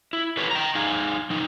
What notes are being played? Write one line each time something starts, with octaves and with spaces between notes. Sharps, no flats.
E4
E4 G4 A4 B4 C#5
G5 A#5
D#4 G#4 F5
F3 D#4